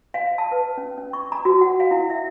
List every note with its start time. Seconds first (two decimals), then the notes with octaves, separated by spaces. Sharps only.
0.14 F5
0.38 A5
0.52 B4
0.77 C#4
0.98 C#4
1.13 C#6
1.32 A#5
1.45 F#4
1.61 F#5
1.80 F5
1.91 E4
2.10 E5